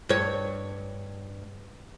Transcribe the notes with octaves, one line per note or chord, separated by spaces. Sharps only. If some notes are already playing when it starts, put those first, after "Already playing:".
G2 C#5